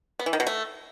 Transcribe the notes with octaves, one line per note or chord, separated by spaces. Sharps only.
B3
E3
D#3
B2
A3